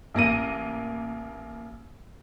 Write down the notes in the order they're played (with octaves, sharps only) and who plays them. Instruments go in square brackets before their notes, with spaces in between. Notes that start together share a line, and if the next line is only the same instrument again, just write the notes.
[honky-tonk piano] A1 A#3 A#6 D#7